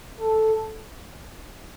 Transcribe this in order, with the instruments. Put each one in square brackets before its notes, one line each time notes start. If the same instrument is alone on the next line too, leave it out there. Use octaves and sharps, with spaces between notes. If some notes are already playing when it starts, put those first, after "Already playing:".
[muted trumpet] A4